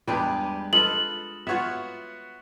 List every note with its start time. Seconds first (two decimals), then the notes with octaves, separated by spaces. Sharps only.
0.08 E2 G3 G#3 D4 G4 B4
0.73 F4 A4 B4 D#5 F#7
1.47 B3 F4 F#4 C#5 E5